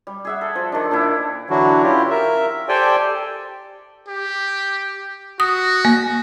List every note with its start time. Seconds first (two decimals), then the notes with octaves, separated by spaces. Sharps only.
0.07 G3
0.25 G#4 E5 F#5
0.41 A4
0.55 F3
0.72 D#3 D4
0.91 A#2 D4 E4
1.50 D3 E3 F#3 D4 E4 F#4
1.83 C#4 E4 F4 G4
2.10 A#4 E5
2.69 G4 A4 C5 D5 G5 G#5
4.07 G4
5.40 F#4 D#6
5.85 A#3